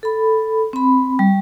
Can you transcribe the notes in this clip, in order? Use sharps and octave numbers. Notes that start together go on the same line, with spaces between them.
A4 B5
C4 B5
G3